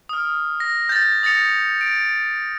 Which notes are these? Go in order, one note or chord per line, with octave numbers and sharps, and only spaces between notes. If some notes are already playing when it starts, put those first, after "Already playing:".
D#6 F6
A#6
G6 A6
D#6 A6 A#6 C#7 F7
D7